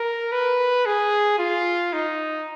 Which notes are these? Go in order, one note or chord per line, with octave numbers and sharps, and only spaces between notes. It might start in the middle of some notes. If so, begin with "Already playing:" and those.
Already playing: A#4
B4
G#4
F4
D#4